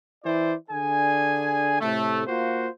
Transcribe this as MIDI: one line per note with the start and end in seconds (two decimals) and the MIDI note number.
0.24 0.54 52
0.24 0.54 64
0.24 0.54 72
0.24 0.54 74
0.70 1.80 50
0.70 1.80 62
0.70 1.80 68
0.70 1.80 80
1.80 2.24 45
1.80 2.24 48
1.80 2.24 57
2.27 2.68 58
2.27 2.68 65
2.27 2.68 66
2.27 2.68 72